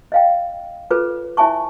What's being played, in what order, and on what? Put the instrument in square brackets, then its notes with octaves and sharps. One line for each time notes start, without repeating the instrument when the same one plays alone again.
[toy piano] D#5 F5 G5
F4 G#4 A4 B4 C#5
E4 C#5 E5 G#5 A5 C#6